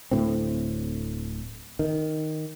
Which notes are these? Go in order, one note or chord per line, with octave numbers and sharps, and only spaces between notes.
D1 A2 D3 C4
D#3